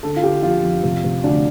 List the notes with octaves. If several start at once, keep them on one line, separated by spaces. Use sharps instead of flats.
D3 A4
F4
D3 G4
F2 F4
F2
C3
C3
D2 D4